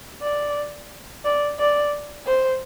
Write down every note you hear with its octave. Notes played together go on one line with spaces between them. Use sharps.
D5
D5
D5
C5